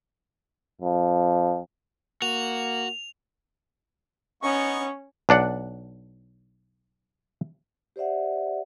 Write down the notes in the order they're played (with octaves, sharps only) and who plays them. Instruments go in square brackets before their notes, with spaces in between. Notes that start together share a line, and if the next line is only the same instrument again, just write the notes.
[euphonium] F2
[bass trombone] A#3 [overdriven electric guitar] F#4 [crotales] F7
[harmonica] B3 D#4 C#6 [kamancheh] C#4
[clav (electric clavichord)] B1 D4 D5 F#5
[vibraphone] G4 C5 D5 E5 F#5